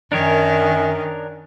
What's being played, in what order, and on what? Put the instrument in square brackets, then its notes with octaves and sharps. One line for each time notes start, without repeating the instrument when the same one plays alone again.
[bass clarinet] F#2 [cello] D#3 [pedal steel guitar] D4 A#4 C#5